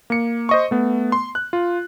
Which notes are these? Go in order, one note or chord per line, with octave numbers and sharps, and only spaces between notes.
A#3 C#7
C5 D#5 C#6
A3 B3
C6
F#6
F4